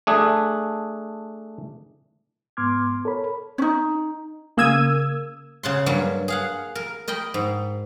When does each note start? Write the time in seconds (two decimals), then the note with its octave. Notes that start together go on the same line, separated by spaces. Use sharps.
0.07 A3 D4 G#4
2.57 G#2 B3 C6 D6 F6 G#6
3.05 A4 A#4 C#5 B5
3.58 C#4 D#4
4.57 C#3 A#3 D#6 E6 G#6 D#7
5.63 C#3 F#5 C6
5.86 G2 F#3 A#3 A5
6.28 G#4 F5 F#5
6.75 A#4
7.08 A#4 D#5 G5 B5
7.34 G#2